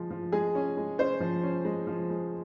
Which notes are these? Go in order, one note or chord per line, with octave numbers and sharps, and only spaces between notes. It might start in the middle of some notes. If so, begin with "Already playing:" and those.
Already playing: F3 G#3
F3
G#3 G#4
C#4
G#3
C#4 C5
F3
C#4
G#3
F3
G#3